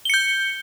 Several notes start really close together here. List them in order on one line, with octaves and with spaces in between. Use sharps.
G7 C#7 G6